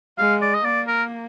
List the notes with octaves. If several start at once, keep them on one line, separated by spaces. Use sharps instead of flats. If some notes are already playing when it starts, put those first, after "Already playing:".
G#3 F5
D5
D#5
A#3 D5
A#4